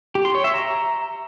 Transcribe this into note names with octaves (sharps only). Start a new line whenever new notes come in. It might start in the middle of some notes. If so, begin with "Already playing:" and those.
G4
C6
C#5
E5
A#5